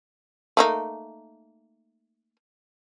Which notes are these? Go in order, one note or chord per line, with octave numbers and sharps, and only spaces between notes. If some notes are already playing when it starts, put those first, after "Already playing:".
A3 A#3 D#4